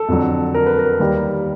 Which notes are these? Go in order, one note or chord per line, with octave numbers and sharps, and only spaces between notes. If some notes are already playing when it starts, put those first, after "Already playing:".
Already playing: A4
F2 D3 F#3
A#4
B4
A#4
D#2 D#3 G3